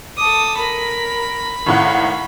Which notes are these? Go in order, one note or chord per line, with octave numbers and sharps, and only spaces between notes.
A4 D6 D#6
A#4 B5
G#1 A2 F5 F#5